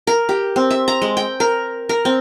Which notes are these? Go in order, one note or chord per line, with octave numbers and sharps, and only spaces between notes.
A#4
G4
C4
E5
A#5
G#3
G5
A#4
A#4
C4